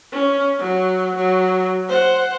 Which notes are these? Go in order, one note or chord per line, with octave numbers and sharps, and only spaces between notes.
C#4
F#3
F#3
C5 F#5